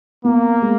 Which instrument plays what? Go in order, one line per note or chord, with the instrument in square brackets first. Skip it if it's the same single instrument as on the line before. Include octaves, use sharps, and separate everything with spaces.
[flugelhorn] A#3 [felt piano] B3
[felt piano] G#3